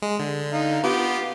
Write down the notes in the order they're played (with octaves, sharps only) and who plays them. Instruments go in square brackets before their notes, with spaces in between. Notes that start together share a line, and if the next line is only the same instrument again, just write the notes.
[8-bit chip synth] G#3
D3
[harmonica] D#4 F5
[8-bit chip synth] B3 [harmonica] F4 G4